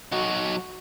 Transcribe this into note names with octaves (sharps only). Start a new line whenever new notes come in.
F#3 D#4 F#4